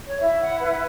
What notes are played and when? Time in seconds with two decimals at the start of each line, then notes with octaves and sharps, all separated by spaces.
0.07 C#5
0.20 E4 E5
0.41 F#5
0.60 B4 F#5